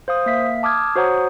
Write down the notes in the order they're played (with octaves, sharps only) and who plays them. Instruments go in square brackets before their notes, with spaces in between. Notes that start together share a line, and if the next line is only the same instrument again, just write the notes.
[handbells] C5 F5 D#6
A#3 E5 F5 B6
A5 D6 D#6 F6 G#6
F#4 C5 C#5 F#5 A#5 D#6